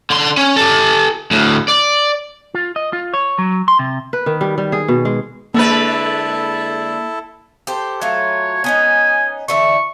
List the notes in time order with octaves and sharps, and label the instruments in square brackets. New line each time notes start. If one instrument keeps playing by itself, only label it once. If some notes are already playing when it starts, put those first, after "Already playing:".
[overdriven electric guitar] D3 C6
C#4
G4 A4
D2 A2
D5
[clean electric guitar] F4
D#5
F4
C#5
F#3
C6
C3
[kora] B4
D#3
G3
G3
G#4
B2
G#3
[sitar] D3 G#3 B4 [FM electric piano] A#3 [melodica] E4 A4 A5
[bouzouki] G4 A4 C5
[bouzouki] F#3 A3 F4 [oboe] C#5
[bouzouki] B3 C#4 D#4 [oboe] G#5
[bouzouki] D3 E3 E5 [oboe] C#6